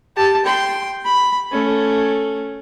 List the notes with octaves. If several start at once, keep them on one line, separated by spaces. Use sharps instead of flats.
G4 A5
G5 C6
B5
A3 C#4